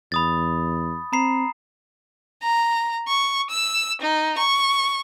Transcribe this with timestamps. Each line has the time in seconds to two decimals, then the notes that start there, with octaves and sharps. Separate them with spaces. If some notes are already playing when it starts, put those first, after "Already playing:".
0.12 E2 B5 D#6 A6
1.13 C4 A#5 B5 C7
2.42 A#5
3.08 C#6
3.50 E6
4.01 D#4
4.38 C#6